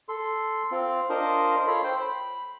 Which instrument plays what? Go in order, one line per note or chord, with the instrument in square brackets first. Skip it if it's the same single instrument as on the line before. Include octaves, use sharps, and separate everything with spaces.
[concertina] A4 C6
C4 F4
D4 F4 A#4 C5 D#5
F4 A4 C#5 B5 C6
C5 G5
B5